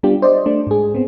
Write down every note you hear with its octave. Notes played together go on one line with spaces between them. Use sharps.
G3 B3 D4 F4 G4
C5 D5 D#5
A3 D4
G#2 G#4
B3 C4